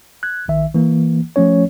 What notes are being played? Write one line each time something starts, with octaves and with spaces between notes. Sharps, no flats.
F#6 G#6
A#1 D#3 E5
E3 A#3
F3 A3 C#4 C#5